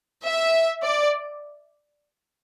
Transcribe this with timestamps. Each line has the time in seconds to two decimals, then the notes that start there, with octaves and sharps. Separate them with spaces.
0.23 E5
0.83 D5